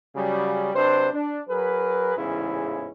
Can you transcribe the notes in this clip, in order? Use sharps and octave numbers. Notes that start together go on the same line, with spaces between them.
C#3 F#3 G3
C3 F#3 D4 B4 C5
D4
F#3 G#4 A#4 B4
A1 E2 G#2 C#3 C#4 E4